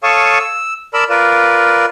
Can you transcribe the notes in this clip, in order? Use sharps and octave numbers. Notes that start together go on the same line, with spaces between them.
A4 C#5 F5 A5 C#6 D#6
E6
A#4 D5 A5 B5 E6
F4 A#4 B4 D5